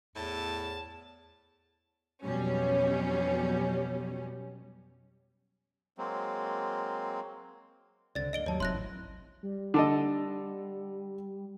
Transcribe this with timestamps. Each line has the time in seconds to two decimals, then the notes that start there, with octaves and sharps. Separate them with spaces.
0.16 E2 A2 A5
2.24 F2 B2 F#3 G3 C#4
5.98 F#3 G#3 A#3 C4
8.15 C#2 D3 C4 D5 A6
8.33 A#3 D4 D#5 D7 G7
8.46 D#2 F#3 G3 A#3 C#5 A5
8.60 E1 C3 F#3 D#4 C6 F#6 A#6
8.74 A1 E4
9.43 G3
9.74 D3 A4 D#5